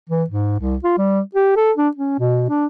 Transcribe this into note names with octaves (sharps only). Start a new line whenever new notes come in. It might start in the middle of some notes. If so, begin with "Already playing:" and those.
E3
G#2
C2
F4
G3
G4
A4
D4
C#4
B2
D4